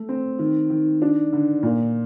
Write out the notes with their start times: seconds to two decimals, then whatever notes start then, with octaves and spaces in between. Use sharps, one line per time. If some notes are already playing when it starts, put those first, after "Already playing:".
Already playing: A3
0.09 C4
0.39 D#3
0.70 D#3
1.02 D4
1.33 D3
1.63 A#2